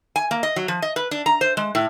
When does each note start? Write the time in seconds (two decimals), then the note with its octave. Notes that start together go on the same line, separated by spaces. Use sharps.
0.16 G#5
0.31 A#3
0.43 D#5
0.56 F#3
0.68 F3
0.82 D#5
0.96 B4
1.11 D4
1.26 A#5
1.41 C5
1.57 G#3
1.75 A2